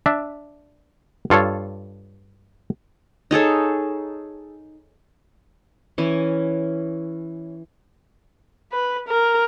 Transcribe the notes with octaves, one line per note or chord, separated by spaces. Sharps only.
D4 E5
G2 F4 A4 C#5
D#4 G#4 A4 C#5
E3 C#4
B4
A#4